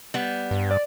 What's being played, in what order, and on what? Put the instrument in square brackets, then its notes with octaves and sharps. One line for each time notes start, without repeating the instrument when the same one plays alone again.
[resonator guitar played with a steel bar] G3 B3
[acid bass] G2
[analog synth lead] D5